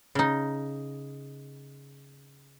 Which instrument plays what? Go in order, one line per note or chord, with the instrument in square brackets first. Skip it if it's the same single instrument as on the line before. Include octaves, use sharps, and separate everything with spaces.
[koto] C#3 D#4